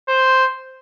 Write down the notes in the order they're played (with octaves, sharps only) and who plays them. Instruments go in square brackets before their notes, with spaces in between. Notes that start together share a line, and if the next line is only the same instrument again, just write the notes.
[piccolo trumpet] C5